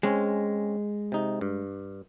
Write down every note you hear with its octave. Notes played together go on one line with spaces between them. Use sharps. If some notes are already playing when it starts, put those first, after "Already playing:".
G#3 C4 C#4
C3 D#4
G2